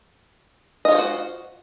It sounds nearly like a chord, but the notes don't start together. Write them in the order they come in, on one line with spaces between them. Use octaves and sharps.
D#5 F4 C#5 C5 F#4